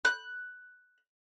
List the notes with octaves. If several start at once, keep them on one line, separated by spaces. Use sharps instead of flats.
F#6